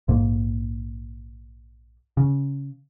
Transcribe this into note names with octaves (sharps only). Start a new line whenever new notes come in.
A#1 G#2 A#3
C#3